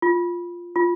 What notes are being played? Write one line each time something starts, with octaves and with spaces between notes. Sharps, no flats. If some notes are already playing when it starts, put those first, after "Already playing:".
F4
F4